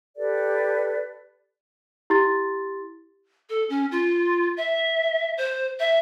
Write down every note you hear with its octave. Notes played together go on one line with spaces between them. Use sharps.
G4 A4 B4 D5
E4 G4 C6 A6
A4
C#4
F4
E5
C5
E5